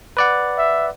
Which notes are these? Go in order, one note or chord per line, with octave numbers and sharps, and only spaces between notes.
B4 D5 F#5
E5